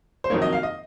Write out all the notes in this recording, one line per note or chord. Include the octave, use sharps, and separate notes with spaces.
C5
F2 D#3 F#3 A#3 C#5
D#5
F5
D#5